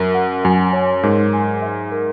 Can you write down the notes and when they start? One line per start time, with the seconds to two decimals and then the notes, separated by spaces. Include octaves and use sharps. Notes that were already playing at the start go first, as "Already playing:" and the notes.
Already playing: F#2 A#4
0.14 F#5
0.44 F#2 G#5
0.73 C#5
1.03 G#2 A#4
1.33 G#5
1.62 E5
1.92 A#4